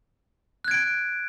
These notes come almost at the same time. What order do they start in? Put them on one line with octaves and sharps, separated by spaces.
F#6 G#6 D7